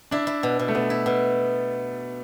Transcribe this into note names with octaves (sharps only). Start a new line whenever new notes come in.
D4 E4
E4
B2
B2
A3
B2 B3
E4
B2